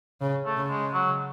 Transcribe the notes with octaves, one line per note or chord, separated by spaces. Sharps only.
C#3
A3
C#3
G#3
F#3